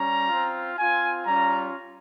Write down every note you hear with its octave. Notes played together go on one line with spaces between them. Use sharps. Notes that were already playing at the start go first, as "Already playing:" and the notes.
Already playing: G3 C#4 A#5
C4 F4
C4 F4 G#5
G3 C#4 F4 A#5